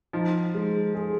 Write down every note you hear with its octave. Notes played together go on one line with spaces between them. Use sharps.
F3 D#4
G#3
G#4